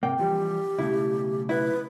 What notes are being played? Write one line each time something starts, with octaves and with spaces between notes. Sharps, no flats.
G#2 C3 A#3 G5
E3 F3 G3 G4
B1 C#3 A3 E4
E4 B4